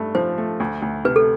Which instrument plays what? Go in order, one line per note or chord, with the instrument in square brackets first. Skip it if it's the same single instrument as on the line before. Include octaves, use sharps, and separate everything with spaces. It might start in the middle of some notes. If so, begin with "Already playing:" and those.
Already playing: [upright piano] G2 A3
[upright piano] F3 [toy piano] C5
[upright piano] A3
D2
D2
[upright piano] C3 [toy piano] B4
[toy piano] A4